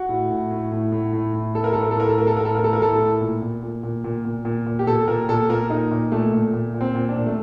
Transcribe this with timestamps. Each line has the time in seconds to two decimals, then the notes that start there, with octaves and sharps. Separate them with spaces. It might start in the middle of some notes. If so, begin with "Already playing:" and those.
Already playing: F#4
0.09 A2
0.30 A2
0.51 A2
0.72 A2
0.92 A2
1.13 A2
1.34 A2
1.55 A2 A4
1.64 A#4
1.73 A2 A4
1.82 A#4
1.91 A4
1.96 A2 A#4
2.09 A4
2.17 A2 A#4
2.27 A4
2.37 A2 A#4
2.45 A4
2.55 A2 A#4
2.64 A4
2.73 A#4
2.80 A2 A4
3.00 A2
3.21 A#2
3.42 A#2
3.63 A#2
3.83 A#2
4.04 A#2
4.25 A#2
4.45 A#2
4.66 A#2
4.79 G4
4.87 A#2 A4
5.08 A#2 A#4
5.29 A#2 A4
5.49 A#2 A#4
5.70 A#2 D#4
5.91 A#2
6.12 A#2 A3
6.33 A#2
6.54 A#2
6.74 A#2
6.81 C4
6.95 A#2
7.09 D4
7.16 A#2
7.27 A3